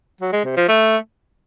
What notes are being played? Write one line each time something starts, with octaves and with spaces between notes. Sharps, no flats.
F#3
G#3
C3
F3
A3